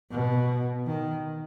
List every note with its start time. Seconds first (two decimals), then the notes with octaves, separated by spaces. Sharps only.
0.11 B2
0.86 D#3